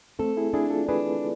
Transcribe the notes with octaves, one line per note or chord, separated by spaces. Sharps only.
A3 C4 A4
E4 G#4
D4 E4 G#4
F4 A4
D4 G#4 B4